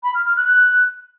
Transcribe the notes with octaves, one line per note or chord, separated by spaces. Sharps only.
B5
F6
F6
F#6
F#6